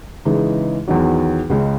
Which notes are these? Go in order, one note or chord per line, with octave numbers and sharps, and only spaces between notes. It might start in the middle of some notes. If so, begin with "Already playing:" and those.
C#3 E3 G#3 D#4
E2 D#3 F#3
C#2 C#3 G#3